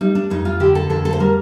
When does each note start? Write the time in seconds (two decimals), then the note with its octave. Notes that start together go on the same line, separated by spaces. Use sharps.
0.01 G3 D#4
0.15 D4
0.30 F2 D#4
0.45 F4
0.60 D3 G4
0.75 A4
0.90 F2 A4
1.05 A4
1.13 C5
1.20 G3 A#4